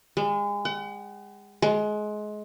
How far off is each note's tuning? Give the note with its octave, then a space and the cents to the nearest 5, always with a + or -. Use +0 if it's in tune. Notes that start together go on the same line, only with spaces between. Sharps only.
G#3 -30
F#5 +40
G#3 +25